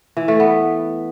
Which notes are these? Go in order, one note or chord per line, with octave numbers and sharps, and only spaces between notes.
E3
A3
B3